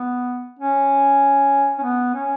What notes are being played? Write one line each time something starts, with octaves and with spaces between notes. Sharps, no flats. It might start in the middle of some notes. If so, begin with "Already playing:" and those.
Already playing: B3
C#4
C#4
B3
C#4